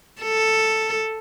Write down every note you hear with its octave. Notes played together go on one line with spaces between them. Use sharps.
A4